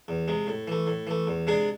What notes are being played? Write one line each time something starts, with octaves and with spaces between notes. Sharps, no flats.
E2
C3 G#3
A2
E3 A3
A2
E3 A3
E2
C3 G#3 D4 G#4